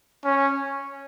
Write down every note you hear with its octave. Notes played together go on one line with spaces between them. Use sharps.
C#4